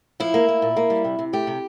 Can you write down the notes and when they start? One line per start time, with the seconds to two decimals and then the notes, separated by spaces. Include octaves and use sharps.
0.20 F3 E4
0.34 A#3
0.49 A#3
0.62 A#2
0.77 A#3
0.90 G3
1.04 C3
1.19 C3
1.33 A3 G4
1.47 C3